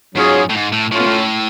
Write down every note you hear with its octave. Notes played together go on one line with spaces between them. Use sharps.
G#2 F#3 C#4 F4 G#4
A2
G#2
A2
A2 A3 C#4 F4
B2
A2